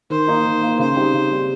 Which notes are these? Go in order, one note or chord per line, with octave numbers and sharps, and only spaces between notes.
D#3 C5
A#3 D#4
D#3
A#3 D#4
C#3 C5
G3 C4 D#4 G4
C#3
G3 C4 D#4 G4